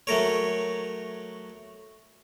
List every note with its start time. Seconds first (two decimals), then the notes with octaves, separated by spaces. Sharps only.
0.07 F#3 A3 A#4 C#5